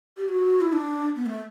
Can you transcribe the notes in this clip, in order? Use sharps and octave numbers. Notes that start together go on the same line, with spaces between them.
G4
F#4
E4
D4
B3
A3